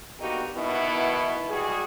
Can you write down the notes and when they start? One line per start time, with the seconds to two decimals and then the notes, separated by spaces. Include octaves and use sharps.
0.19 D3 A#3 B3 D#4 F#4 G4
0.55 B2 D#3 B3 E4
1.49 G3 G#3 F#4 G#4